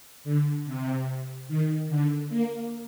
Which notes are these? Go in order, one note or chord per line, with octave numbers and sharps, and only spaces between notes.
D3
C3
D#3
D3
A#3